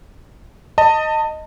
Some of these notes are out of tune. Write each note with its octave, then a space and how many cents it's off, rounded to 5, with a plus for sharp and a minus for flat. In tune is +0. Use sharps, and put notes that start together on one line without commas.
D#5 +0 A5 +30